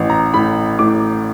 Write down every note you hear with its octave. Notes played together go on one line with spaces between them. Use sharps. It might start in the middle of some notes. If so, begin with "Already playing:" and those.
Already playing: A1
A#5
A2 B5
A2 D6